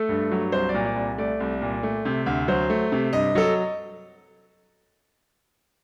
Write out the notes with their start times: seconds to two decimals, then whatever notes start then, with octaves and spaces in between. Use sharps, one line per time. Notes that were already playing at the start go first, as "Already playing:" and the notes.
Already playing: A3 A4
0.09 G2
0.31 F#3
0.52 C2 C5
0.69 D5
0.74 A#2
0.86 D5
0.96 C2
1.18 A3 D5
1.40 C2
1.61 A#2
1.83 A3
2.05 C3
2.26 D2
2.48 F#3 C5
2.70 A3
2.92 C3
3.13 G2 D#5
3.35 F#3 A4